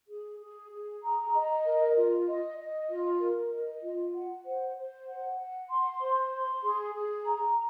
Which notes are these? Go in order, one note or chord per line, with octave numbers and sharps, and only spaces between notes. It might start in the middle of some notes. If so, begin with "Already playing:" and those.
G#4
G#4
G#4
A#5
D#5
A#4
F4
D#5
D#5
F4
A#4
D#5
F4
F#5
C5
C5
F#5
F#5
C6
C5
C6
G#4
G#4
A#5